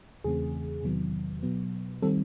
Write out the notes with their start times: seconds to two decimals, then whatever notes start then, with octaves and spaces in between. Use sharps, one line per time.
0.24 E2 C#3 E3 A3 C4 G#4
0.84 E2 C3 D#3 F#3 B3
1.43 B2 F#3 B3
2.02 D#3 G3 C4 A4